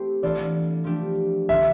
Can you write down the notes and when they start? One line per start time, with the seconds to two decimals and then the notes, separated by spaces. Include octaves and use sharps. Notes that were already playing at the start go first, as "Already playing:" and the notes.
Already playing: A3 C4 E4 G4 C5
0.23 E3 B3 D4 F4 A4 D5
0.84 F3 A3 D4 G4
1.49 D3 F3 B3 F4 E5